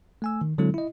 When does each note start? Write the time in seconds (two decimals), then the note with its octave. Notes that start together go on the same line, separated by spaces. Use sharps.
0.22 A3 G#5 E6
0.41 D#3
0.58 D3 F#3 G#3 C4 E4 A4
0.74 E4 D#5